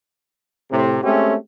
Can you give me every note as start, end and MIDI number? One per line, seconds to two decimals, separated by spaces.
0.71 0.99 45
0.71 0.99 48
1.03 1.35 56
1.03 1.35 57
1.03 1.35 60
1.03 1.35 61
1.03 1.35 67